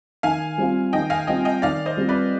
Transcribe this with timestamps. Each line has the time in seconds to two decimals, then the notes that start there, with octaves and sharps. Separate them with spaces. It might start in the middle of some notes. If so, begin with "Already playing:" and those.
0.23 D#3 F5 G#5
0.58 G3 C4 F4
0.93 D#3 D#5 G5
1.10 F5 G#5
1.27 G3 C4 F4 D#5 G5
1.45 D#5 G5
1.62 D#3 D5 F5
1.86 C5 D#5
1.97 G3 C4 F4
2.09 B4 D5